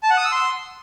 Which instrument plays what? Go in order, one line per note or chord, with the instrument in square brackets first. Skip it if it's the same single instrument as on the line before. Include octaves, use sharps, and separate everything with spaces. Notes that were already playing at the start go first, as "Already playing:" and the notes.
[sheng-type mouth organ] A5
F#5
D#6
E6
C6